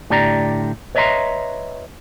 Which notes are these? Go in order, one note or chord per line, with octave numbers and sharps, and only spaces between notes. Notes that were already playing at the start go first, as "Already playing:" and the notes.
A2 D3 G4 D5 A#5
B4 C#5 D#5 E5 A#5 C6